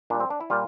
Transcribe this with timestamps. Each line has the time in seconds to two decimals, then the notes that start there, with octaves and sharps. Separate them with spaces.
0.10 A#2 D4
0.15 G3
0.20 C4
0.30 D4
0.41 E4
0.50 A#2 G3 F4